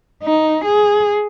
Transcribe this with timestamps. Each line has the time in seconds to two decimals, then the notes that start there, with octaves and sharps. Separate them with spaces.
0.23 D#4
0.64 G#4